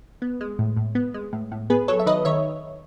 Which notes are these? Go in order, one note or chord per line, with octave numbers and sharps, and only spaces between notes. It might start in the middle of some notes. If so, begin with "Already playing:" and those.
B3
G#3
A2
A2
B3
G#3
A2
A2
B3 G#4 B4
F#3 A4 C#5
E5
D#3 B4 D#5
D#3 C#5 E5